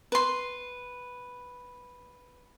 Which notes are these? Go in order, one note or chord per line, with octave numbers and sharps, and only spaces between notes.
B4 C6